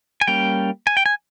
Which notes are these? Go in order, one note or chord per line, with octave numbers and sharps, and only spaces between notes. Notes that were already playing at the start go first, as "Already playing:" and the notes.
G#5
G3 A#3 C#4 G5
G#5
G5
G#5